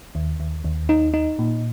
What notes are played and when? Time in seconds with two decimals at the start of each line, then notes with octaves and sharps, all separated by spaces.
0.15 D#2
0.40 D#2
0.64 D#2
0.89 D#4
1.14 D#4
1.39 A#2